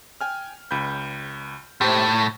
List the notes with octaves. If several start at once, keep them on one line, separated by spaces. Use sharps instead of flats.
G5 G#5 F6
C#2 B5 G6
A2 G4 C5
C#6